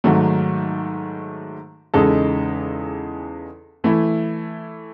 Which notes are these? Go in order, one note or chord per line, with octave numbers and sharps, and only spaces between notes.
G#2 D#3 F#3 A3
E2 C#3 G#3 D#4 A4
E3 A3 E4